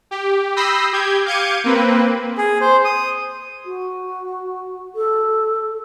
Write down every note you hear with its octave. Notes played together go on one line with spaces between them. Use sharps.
G4
B5 D#6 E6 G6 A#6 C7
G4 G6 G#6
F5 D6 G6 G#6 C#7 D#7
A#3 C4 B4
G#4
C5
D#6
F#4
A4